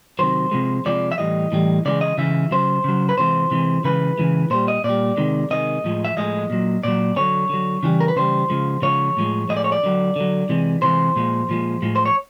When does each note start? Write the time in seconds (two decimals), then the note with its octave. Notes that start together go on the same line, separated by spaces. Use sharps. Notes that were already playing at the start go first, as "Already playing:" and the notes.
0.19 C3 D#3 F#3 C5
0.51 C3 F3 G#3
0.86 C3 F3 G#3 D5
1.12 E5
1.18 A2 E3 G3 D#5
1.52 A2 E3 G3
1.85 C#3 E3 G#3 D5
2.01 D#5
2.18 C#3 E3 G#3 E5
2.51 C#3 F#3 C5
2.84 C#3 F#3
3.09 B4
3.18 C3 E3 G#3 C5
3.51 C3 E3 G#3
3.84 C#3 E3 G#3 B4
4.18 C#3 E3 G#3
4.50 A#2 G3 C5
4.68 D#5
4.84 A#2 G3 D5
5.17 C3 D#3 G#3
5.51 C3 D#3 G#3 D#5
5.84 A2 F3 G#3
6.05 E5
6.17 A2 F3 G#3 D#5
6.50 A#2 F#3
6.83 A#2 F#3 D5
7.16 D3 F#3 C#5
7.49 D3 F#3
7.83 C#3 E3 G3
8.00 A#4
8.08 B4
8.16 C#3 E3 G3 C5
8.50 C#3 F3 G#3
8.82 C#3 F3 G#3 C#5
9.17 A2 F3 G#3
9.49 A2 F3 G#3 D#5
9.57 D5
9.64 C#5
9.72 D5
9.83 D3 F#3
10.16 D3 F#3
10.49 C3 E3 G#3
10.82 C3 E3 G#3 C5
11.16 A#2 F3 G#3
11.49 A#2 F3 G#3
11.82 A2 F3 G#3
11.96 C5
12.06 C#5